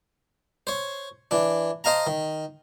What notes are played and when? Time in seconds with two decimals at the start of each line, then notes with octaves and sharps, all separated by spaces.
0.67 C5 C#5
1.31 E3 D4
1.84 C5 D#5 F5 A5 A#5
2.07 D#3